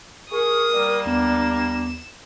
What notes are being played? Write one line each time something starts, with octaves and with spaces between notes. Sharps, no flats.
G#4 A#4 C#6 D#6
G3 A#3
D#2 B3 D4 E7